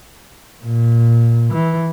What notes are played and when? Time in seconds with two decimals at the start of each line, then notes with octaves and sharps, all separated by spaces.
0.64 A#2
1.53 E3